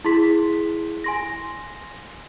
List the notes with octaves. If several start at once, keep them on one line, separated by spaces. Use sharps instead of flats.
E4 G#4 C6 B6
G#5 C6 A#6